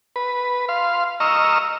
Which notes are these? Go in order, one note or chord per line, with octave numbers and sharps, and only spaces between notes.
B4
F5 C6
D#5 A#5 C#6 E6 F6